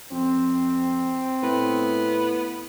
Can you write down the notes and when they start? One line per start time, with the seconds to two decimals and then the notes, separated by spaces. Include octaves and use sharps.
0.12 F2 C4
1.43 A2 B3